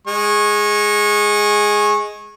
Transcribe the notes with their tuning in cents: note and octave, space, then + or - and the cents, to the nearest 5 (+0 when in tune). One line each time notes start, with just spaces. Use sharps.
G#3 +0 C#6 -25